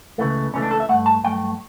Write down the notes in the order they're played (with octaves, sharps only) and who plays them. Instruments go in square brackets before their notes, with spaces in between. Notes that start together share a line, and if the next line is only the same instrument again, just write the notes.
[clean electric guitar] C#2 C#3 E3 A3
C#2 C#3 E3 A3 C#4
D4
A4
E5
G2 F#3 A3 F#5
A5
G2 F#3 A3 G5